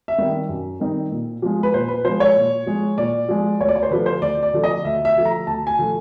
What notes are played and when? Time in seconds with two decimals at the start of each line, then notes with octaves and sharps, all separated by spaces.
0.08 E5
0.18 D#3 G3 C4 D#4
0.49 F#2
0.80 D#3 G3 C4 D#4
1.11 A#2
1.42 F3 G#3
1.63 B4
1.73 A#2 C5
1.88 B4
2.05 F3 G#3 C5
2.20 C#5
2.36 A#2
2.66 F3 G#3
2.97 A#2 D5
3.29 F3 G#3
3.60 D2 C#5
3.68 D5
3.76 C#5
3.83 C5
3.90 D3 F3 A3 B4
4.06 C5
4.22 D2 D5
4.43 D5
4.53 D3 F3 A3
4.64 D#5
4.84 D2 E5
5.05 E5
5.15 D3 F3 A3
5.25 A#5
5.47 D2 A5
5.67 G#5
5.78 D3 F3 A3